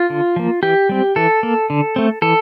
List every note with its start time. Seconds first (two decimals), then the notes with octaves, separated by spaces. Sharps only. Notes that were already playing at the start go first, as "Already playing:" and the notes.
Already playing: F4
0.10 D3
0.36 F3 A#3
0.63 E3 G4
0.89 G3 C4
1.16 E3 A4
1.43 A#3
1.70 D3
1.96 A3 C4
2.22 E3 A4